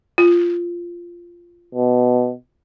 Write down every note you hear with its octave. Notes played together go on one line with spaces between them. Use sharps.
F4
B2